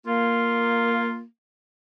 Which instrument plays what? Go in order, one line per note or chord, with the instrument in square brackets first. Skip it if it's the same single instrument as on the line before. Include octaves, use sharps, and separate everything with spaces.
[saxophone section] A#3 [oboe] F4